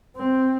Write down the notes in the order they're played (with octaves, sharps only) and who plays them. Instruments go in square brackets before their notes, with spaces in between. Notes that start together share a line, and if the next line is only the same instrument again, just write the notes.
[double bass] C4